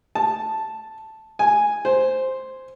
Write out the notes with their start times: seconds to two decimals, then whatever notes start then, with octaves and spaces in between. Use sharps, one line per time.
0.15 A5
1.39 G#5
1.85 C5